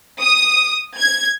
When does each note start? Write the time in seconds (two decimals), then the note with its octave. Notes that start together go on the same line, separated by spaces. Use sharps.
0.20 D#6
0.98 G#6